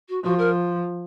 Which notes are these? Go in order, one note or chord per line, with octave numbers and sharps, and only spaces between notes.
F#4
F3 F#4
A#4